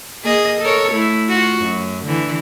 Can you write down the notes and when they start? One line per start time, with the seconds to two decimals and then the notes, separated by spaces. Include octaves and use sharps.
0.24 A#3 G#4 D#5
0.61 A4 A#4 C#5
0.92 A3 E4
1.29 F4 F#4
1.63 F#2
2.05 D3 E3